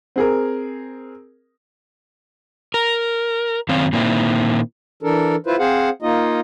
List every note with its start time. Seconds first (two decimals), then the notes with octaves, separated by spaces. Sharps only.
0.16 C4 G#4 A#4
2.74 A#4
3.69 F#2 D#3 C4 C#5 F5
3.93 A#2 D#3 A#3 C4 E4
5.03 E3 D4 A4 A#4
5.47 E4 F4 B4 C5
5.59 C4 G#4 C5 F5 F#5
6.02 A#3 D#4 F4 D#5